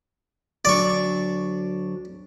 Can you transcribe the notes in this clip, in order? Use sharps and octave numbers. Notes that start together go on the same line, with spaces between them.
D2 F#3 D4 D5 C#6